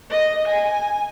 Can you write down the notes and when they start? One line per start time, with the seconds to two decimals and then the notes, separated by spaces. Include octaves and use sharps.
0.11 D#5
0.48 G#5